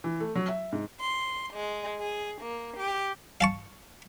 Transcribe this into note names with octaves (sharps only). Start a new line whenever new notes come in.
E3
A3
F#3
E5
G#2
C6
G#3
G#4
A#3
G4
F5 A5 C#6